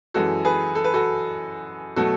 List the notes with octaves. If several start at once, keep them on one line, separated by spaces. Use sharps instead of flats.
F#2 E3 G#3 F#4 A4
G#4 B4
A4
B4
F#4 A4
B2 F#3 A3 F#4 A4